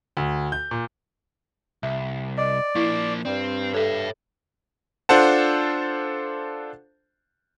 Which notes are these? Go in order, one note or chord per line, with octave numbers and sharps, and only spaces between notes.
D2
G6
A#2
C2 E5
D5 D#5
F3 A#3 E4
G2 C4 D5
A4 C#5 E5
D4 F4 A4 C5 F#5 A5